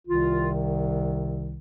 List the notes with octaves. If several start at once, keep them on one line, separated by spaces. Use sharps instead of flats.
C2 C3 D#3 F4